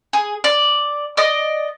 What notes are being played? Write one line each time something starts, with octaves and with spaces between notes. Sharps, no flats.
G#4
D5
D5 D#5